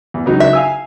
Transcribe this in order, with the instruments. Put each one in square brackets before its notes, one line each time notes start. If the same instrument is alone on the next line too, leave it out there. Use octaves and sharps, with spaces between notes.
[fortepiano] E2
C#2 F#3 D#4
[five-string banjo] E5
[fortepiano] F5 G#5 E6